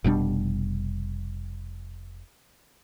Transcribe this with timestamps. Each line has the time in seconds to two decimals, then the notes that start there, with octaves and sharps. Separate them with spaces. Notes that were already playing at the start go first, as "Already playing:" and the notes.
0.04 F1 B2 G3 D4